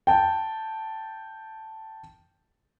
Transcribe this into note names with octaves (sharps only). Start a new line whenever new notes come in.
G5 A5